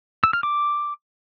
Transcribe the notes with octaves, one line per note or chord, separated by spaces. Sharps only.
E6
F6
D6